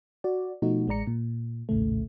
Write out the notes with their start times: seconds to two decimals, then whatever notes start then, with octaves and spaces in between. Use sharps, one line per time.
0.24 F#4 D5
0.62 B2 F3 A3 D#4 F#4
0.88 A1 G#3 D5 A#5 C#7
1.07 A#2
1.69 A#1 D#2 A2 C#3 A3